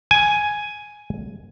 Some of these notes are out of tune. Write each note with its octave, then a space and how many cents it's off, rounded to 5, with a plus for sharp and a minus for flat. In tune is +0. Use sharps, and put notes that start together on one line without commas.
G#5 +5